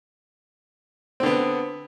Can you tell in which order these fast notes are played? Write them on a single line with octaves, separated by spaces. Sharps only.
C4 D3 B3